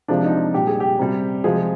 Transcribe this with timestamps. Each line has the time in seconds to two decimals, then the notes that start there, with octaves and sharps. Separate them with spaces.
0.08 C3 F3 G#3 D4
0.25 D#4
0.31 F4
0.54 A#2 G3 G4
0.67 G#4
0.80 G4
0.99 C3 G3
1.44 C3 F3 G#3 G#4